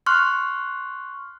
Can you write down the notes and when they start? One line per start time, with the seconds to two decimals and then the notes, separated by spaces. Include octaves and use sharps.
0.06 C6 C#6 F6 F#6